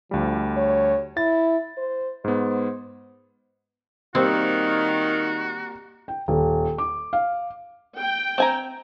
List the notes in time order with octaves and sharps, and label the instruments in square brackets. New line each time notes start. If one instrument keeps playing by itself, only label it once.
[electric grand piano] D2 G3 [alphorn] F3
[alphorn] C#5
[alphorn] E4 [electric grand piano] A6
[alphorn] C5
[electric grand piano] G#2 B3 [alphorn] C5
[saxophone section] D#3 [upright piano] G3 A#3 G4 [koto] C4 [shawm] F#4
[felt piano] G5
D#1
D6
F5
[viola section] G5
[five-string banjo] C4 G#5 A#5